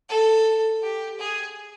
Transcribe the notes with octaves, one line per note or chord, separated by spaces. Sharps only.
A4
G4
G#4